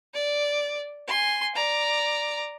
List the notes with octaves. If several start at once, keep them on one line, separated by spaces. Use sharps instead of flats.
D5
G#5 C6
D5 A#5